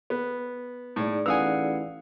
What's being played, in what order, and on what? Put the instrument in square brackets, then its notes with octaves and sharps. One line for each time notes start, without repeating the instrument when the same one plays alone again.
[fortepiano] B3
[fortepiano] A2 [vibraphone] D#4 G#4 D5
[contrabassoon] A1 [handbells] B4 F5 F#5 [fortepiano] G#5 D#6 E6